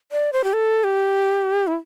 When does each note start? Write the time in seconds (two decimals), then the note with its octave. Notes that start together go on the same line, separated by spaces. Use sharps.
0.12 D5
0.33 C5
0.44 G4
0.53 A4
0.84 G4
1.67 E4